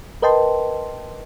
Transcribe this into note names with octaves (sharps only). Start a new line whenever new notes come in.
A#4 B4 D#5 G5 A5 C6